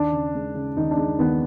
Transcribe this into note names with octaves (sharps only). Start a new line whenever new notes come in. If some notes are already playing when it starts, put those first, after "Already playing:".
Already playing: D#2 D4
C#3
G#3
C#3
D#2 D#4
D4
G#3
D#2 B3